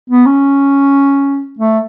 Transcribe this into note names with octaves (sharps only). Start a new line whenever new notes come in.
B3
C#4
A3